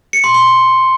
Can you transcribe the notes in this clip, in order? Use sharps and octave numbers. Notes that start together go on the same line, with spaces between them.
C#7
C6
C6